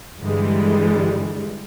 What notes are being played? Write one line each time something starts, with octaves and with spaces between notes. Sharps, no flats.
G2 D3 E3 G3 G#3